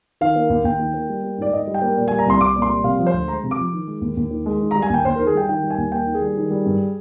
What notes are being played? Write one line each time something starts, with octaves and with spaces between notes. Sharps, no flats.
D#3 F5
A#3
D#2
D#2 G5
D#3
A#3
G3
A#3
G#2 D5
G#2 D#5
G3
G5
A#3
A#2
G3 G#5
A#5
C2 C6
C2 D6
A#2
C6
G3
C3 F5
F3
C5
D2
G#3 A#5
C3
D6
F3
D#3
G#3
D#2
D#2
D#3
G#3
D#3
G3 A#5
G#5
D#2 G5
D#2 C5
D#3 A#4
G#4
G3 G5
D#3 G5
G3
G#5
D#2
A#3 G5
D#3
G#4
G3
D#3
G3
G2